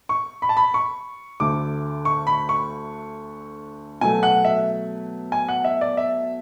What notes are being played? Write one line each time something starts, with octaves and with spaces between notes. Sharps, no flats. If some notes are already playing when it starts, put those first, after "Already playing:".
C#6
B5
A5
B5
C#6
D2 D3 A3 D6
C#6
B5
C#6
B2 F#3 A3 G#5
F#5
E5
G#5
F#5
E5
D5
E5